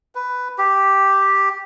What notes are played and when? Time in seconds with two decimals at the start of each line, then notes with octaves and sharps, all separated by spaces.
0.15 B4
0.58 G4